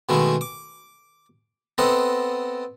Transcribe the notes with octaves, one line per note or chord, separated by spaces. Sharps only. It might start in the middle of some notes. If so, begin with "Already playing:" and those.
B2 D#3 G#3 A3 E4
D6
B3 C4 A4 D#5 F#5